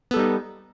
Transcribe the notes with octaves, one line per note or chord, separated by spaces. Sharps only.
G3 B3 D#4 A4